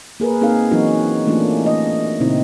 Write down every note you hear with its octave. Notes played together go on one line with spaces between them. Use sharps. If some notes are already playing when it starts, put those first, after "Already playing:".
A#3 G#4 A#4 B4
A#3 C4 D#4 G#4 A#4 F5
E3 F#3 C4 C#4 D#4 F#4
E3 A3 A#3 C#4 D4 F4
A3 D#5
A#2 C#3 C4 D#4 E4